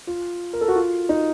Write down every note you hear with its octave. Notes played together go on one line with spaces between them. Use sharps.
F4
A#4
A4
F#4
F4
D#4